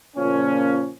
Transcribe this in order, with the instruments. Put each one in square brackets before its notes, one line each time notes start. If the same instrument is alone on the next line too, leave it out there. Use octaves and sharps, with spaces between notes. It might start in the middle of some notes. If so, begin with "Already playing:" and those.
[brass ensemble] A#2 C#3 F3 A#3 C#4